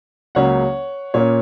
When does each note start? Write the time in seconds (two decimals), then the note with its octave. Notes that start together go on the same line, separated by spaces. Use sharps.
0.35 C#2 C#3 F#3 A#3 C#4 C#5 F#5
1.14 A#2 A#3 C#4 C#5